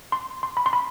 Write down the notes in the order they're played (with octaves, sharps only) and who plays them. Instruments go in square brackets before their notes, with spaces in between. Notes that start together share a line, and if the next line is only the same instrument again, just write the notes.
[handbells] C6
C6
B5
C6
B5